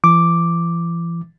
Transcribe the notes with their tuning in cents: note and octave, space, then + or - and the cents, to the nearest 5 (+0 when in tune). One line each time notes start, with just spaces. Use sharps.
E3 +40 D6 +0